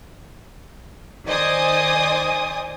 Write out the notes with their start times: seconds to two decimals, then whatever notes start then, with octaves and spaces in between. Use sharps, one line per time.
1.28 D#3 C5 D5 D#5 G#5 D#6